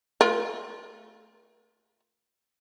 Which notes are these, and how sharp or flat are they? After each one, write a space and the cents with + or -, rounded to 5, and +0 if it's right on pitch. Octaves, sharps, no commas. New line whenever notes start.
A3 +0 F4 +0 A#4 +45